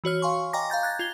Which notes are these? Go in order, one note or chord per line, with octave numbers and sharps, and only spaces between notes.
E3 F#4 C#5 F6
F5 G#5 C6 C#6
D#5 G5 G#5 A#5 D6 A#6
F5 A#5 G6 A6
F#6 G#6 A6
F4 G#6 G7